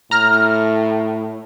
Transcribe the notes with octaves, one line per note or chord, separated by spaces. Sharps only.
A2 A#5 F6